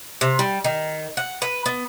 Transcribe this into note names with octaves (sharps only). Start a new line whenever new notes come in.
C3
G3
D#3
F#5
B4
B3